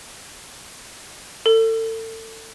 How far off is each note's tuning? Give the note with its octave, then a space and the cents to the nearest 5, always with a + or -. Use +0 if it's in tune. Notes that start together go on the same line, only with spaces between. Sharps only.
A4 +30